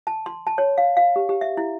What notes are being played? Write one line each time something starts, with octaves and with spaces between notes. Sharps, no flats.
A5
C6
A5
C#5
F5
F5
G4
G4
E5
E4